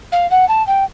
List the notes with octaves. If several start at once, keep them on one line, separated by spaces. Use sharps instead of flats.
F5
F#5
A5
G5